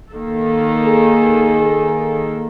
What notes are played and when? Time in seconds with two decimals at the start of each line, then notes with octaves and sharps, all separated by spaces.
0.13 D#3 A#3 A4
0.85 G#4